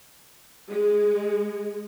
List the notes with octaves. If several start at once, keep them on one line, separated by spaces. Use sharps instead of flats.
G#3